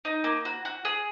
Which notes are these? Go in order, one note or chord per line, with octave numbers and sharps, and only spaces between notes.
D#4
A#3
F#4
F#4
G#4